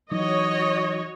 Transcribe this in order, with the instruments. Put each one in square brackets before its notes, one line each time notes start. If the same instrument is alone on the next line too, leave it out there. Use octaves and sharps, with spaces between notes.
[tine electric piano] E3 F#3 D#4 [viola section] F#4 C#5 D#5